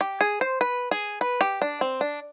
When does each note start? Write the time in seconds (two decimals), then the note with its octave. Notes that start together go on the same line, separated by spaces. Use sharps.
0.01 G4
0.21 G#4
0.41 C5
0.61 B4
0.91 G#4
1.21 B4
1.41 G4
1.62 D4
1.81 C4
2.01 D4